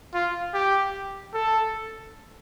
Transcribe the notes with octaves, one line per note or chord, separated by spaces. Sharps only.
F4
G4
A4